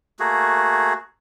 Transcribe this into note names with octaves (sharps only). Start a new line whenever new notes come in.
A3 A#3 F#4 G#4